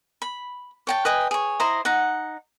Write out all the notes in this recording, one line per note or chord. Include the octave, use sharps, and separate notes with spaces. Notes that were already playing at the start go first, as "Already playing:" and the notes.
B5
C#5 G5 A5
B4 D#5 G5 G#5
G#4 C#5
E4 C5 D#5 A#5
D#4 F#5